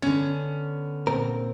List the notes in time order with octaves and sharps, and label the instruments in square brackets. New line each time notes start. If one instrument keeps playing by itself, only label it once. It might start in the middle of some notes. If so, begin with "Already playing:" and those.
[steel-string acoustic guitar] D3 B3 [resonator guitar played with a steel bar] C#4
[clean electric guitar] A#2 C4 A#4